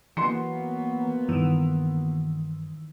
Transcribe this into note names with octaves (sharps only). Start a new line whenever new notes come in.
E3 F#3 A#3 B3 C6 C#7
G2 D#3 E3